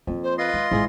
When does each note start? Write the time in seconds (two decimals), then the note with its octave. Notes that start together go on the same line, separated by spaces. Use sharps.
0.07 F2 A#3 C4
0.23 C5
0.38 F4 B4 D#5 C6
0.53 G#3
0.71 A1 G#2 E4 G#4